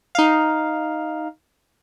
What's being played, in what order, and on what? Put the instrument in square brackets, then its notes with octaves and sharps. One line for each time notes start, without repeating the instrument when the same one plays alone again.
[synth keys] D#4 F5